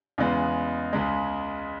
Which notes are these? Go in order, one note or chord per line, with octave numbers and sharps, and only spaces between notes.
E2 C#3 G#3 B3
C#2 C#3 G#3